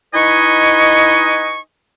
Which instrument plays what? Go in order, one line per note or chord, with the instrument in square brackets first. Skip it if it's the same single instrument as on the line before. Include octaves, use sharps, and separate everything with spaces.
[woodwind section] D#4 E4 B4 D#5 G#5 C#6